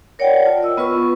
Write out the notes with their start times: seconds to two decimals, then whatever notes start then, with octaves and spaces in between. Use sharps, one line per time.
0.19 A#4 C#5 D5 F#5 G5
0.46 F4 A5
0.63 D#5 E6
0.77 B3 F4 B4 C#6